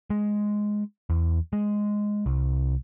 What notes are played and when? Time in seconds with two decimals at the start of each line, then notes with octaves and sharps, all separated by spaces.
0.10 G#3
1.10 E2
1.53 G#3
2.26 C2